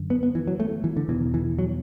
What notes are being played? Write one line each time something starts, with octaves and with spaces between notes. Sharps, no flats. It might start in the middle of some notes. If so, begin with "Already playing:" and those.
Already playing: F#2 D3
B3
B3
E3
F#3
A3
E3
D3
E2 B2 E3
E3
F#3